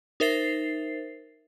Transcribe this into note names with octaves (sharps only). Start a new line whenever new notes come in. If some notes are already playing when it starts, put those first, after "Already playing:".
D#4 A#4 C5 E5 A6 C7